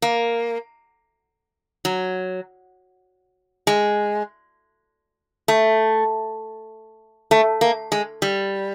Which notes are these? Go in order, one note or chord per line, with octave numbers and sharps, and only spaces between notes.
A#3
F#3
G#3
A3
A3
A#3
G#3
G3